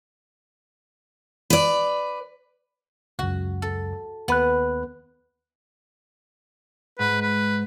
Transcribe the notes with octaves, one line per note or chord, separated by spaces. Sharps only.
B4 D5
C#2 F#2 F#4
A4
D#2 B3 B5 F#6
G#2 B4
B4